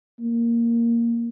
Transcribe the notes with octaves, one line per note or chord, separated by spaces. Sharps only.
A#3